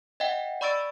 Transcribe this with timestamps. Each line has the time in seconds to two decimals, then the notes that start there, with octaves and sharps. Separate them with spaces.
0.20 D#5 E5 F#5 G5
0.61 D5 B5 C#6 E6 A6 D7